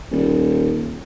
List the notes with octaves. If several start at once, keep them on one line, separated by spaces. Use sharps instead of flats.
D#1